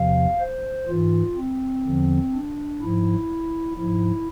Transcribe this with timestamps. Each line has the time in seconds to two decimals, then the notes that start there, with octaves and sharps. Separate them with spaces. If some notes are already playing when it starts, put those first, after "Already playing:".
Already playing: E2 C3 F3 F5
0.40 C5
0.88 G#2 E3 F4
1.37 C4
1.85 E2 D3 F3
2.33 D4
2.81 G#2 F3 E4
3.77 G#2 F3 E4